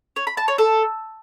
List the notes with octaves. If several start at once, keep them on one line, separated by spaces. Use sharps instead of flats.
C#5
B5
A5
C#5
A4